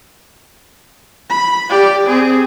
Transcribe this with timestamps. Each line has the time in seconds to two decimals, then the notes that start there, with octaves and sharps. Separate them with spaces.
1.30 B5
1.69 G4 D5
2.07 C4 G#4